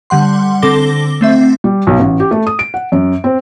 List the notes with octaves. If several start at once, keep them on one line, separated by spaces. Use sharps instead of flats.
D3 G3 F#5 C6
D3 C4 A4 D6 A#6 G7
A3 C4 E5
G3
B1
A1
G4
A3
D#6
D7
F#5
F#2
C4